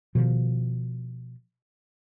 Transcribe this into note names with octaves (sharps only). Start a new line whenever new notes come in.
B2 D#3 F3